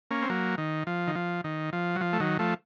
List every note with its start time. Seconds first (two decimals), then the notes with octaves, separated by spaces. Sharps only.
0.11 A#3 C#4
0.22 C4
0.30 F#3 A#3
0.58 D#3
0.87 F3
1.07 D#3
1.15 F3
1.44 D#3
1.73 F3
1.95 F#3
2.01 F3
2.13 A3
2.20 D#3 F#3
2.39 F3 A3